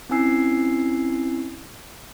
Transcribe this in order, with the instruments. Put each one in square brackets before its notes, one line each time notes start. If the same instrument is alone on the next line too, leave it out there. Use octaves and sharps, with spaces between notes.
[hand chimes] C4 C#4 E4 G#5 E6 C7